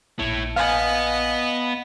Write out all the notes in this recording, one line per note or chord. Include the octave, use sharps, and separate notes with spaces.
A#1 E4 C#5 A5
B3 D#5 F5 G#5